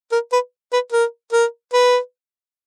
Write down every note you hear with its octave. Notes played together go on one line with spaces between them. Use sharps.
A#4
B4
B4
A#4
A#4
B4